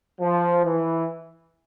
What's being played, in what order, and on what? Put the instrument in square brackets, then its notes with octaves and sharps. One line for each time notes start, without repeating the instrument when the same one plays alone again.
[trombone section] F3
E3